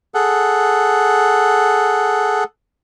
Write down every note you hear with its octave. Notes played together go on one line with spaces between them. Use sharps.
G#4 A4 F#5